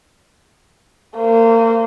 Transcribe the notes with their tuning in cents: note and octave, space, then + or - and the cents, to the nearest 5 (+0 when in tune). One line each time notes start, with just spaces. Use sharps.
A#3 -35 C5 -20